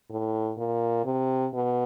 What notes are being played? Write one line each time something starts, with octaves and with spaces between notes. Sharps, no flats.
A2
A#2
C3
B2